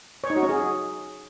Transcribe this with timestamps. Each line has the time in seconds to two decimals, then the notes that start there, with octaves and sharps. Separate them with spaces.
0.24 C#5
0.30 D#4
0.36 F#4
0.43 C#4
0.49 G#4